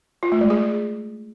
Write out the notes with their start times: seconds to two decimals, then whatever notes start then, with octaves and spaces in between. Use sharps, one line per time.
0.23 F4
0.32 A3
0.41 G#3
0.50 G#4